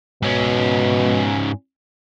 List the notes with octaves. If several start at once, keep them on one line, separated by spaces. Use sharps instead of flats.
G#2 B2 C#4